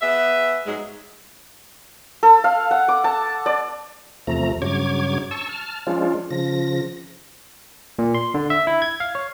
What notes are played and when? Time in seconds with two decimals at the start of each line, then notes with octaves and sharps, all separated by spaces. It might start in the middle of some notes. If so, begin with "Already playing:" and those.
0.02 B3 G#4 E5
0.66 G#2 F#3 G#3
2.23 A4
2.44 F5
2.71 F#5
2.88 D6
3.04 A5
3.46 D5
4.27 E2 C3 F3 A3 A#5
4.62 G2 C#3 F#3 C#5 D6 G#6
5.31 A5 C#6 E6
5.49 A5 F6
5.87 F3 G#3 C#4 D4 F4
6.31 C#3 F3 A#6
7.99 A#2
8.14 C6
8.34 D3
8.50 E5
8.67 E4
8.82 G#6
9.00 F5
9.15 C#5